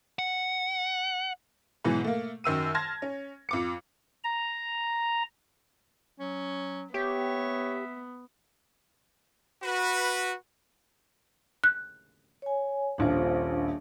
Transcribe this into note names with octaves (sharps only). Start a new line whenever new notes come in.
F#5
G#2 B2 E3 F#3
A3 A#3
F#2 D#3 E6 D#7
A5 C6 F6 G#6 A#6
C#4
F2 D6 C#7
A#5
F#3 C#4
B3 G4 C#5 E5
F#4 B4
F#6
C#5 G#5
D#1 A#1 D4 F4 C5